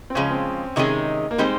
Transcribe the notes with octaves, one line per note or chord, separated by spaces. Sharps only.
C4
C#3 F3 G#3 C#4
C4
C3 D#3 G#3 C#4 D#4 G#4
A#3
G3 G#3 C4 D#4 G4 C5